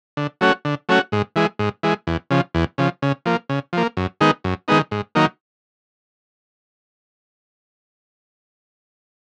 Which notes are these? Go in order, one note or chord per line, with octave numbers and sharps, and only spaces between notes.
D3
F#3 A3 C#4 F#4
D3
F#3 A3 C#4 F#4
G#2
E3 G#3
G#2
E3 G#3
E2
C#3 F3
E2
C#3 F3
C#3
F3 A#3
C#3
F3 A#3
F#2
D#3 G#3 B3 D#4
F#2
D#3 G#3 B3 D#4
G#2
D#3 F#3 A#3 D#4